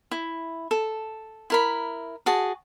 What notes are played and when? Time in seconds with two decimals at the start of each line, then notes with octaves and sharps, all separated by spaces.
0.11 E4
0.71 A4
1.50 E4 A#4 B5
2.26 F#4 G#4 A5